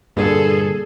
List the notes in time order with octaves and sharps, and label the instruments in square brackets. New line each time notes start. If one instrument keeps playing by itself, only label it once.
[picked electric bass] G2 A#2 D3 [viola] G#4 A4